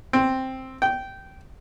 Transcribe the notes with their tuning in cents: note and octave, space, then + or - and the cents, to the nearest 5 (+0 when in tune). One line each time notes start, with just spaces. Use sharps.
C4 +5
G5 -15